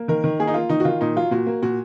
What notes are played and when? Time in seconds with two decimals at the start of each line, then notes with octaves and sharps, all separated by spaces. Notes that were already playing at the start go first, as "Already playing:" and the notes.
Already playing: A#3
0.08 D#3 A#4
0.24 D#3
0.39 A#3 G#4
0.48 D#4
0.54 A#3 F4
0.69 D#3 D#4
0.80 F#4
0.85 D#3 F4
1.01 A#2 D#4
1.16 F#3 F4
1.31 A#2 F#4
1.46 A#3
1.62 A#2 F#4